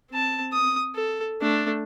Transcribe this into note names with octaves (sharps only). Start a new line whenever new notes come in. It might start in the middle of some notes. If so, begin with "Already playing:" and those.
C4 A5
D#6
A4
A3 D4